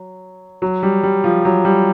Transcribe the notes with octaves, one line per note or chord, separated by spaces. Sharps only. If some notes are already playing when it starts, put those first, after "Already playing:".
Already playing: F#3
F#3
G3
G3
F3
F#3
G3